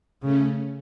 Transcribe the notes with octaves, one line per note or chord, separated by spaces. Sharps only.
C#3 A3 C#4